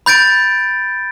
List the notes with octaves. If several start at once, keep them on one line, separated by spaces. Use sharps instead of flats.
B5 G6 A6 D7